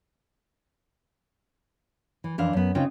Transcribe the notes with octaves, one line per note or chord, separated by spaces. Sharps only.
E3
F2 E3 D4 F5
F#2 B3
C#3 C4 D#4 F4 G5